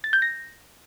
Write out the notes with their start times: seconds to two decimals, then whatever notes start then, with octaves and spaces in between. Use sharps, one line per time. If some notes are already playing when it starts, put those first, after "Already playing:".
0.04 A6
0.13 G6
0.22 A#6